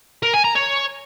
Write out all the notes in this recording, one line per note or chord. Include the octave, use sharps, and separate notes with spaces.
A#4
G#5
A#5
C#5